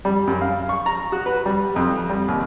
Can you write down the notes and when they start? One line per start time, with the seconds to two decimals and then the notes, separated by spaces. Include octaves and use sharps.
0.05 G3
0.27 F#2
0.41 F5
0.69 C#6
0.86 A#5
1.12 F#4
1.26 B4
1.46 G3
1.76 F2
2.10 G3
2.28 D#2